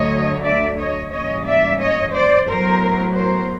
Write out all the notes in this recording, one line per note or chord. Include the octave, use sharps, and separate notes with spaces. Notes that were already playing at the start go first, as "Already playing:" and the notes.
Already playing: D2 D3 F#3 A3 C#5 D#5
D5 E5
C#5 D#5
G#2 E3 G3 A#3 C#4 C#5 D#5
D5 E5
C#5 D#5
C5 D5
A2 F#3 B3 A#4 C5
A#4 C5